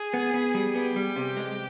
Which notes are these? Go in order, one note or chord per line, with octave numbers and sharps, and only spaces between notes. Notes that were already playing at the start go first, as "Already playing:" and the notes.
Already playing: G#4
B3
B3
G3
B3 G4
G3
C3
G#3